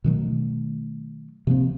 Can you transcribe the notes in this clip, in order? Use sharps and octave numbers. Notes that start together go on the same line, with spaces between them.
B2 D#3 F#3 A3
C3 F3 A#3 C4